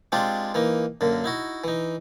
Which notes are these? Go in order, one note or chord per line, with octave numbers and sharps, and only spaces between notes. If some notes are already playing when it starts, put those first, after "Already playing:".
G#3 C4 D4 F4 G4
E3 A#3 D#4
F#2 D3 A#3
D#4 E4 F#4
E3 D#4